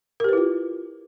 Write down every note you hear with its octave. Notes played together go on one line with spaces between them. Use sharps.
E4 F4 G4 A#4 B4